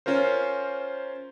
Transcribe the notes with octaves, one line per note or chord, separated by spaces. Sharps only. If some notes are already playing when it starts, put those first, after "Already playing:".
C#4 F4 A#4 C5